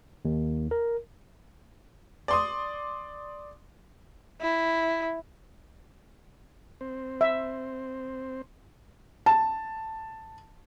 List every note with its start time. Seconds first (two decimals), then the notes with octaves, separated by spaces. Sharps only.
0.25 D#2
0.71 A#4
2.28 D5 C6 D#6
4.41 E4
6.81 C4 C5
7.21 E5
9.26 A5